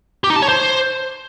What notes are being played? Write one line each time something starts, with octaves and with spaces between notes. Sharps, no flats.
G4
D#4
A5
C#5
C5